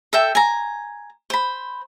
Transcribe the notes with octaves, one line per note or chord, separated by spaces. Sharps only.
A4 E5 G5
G#5 A#5
C5 B5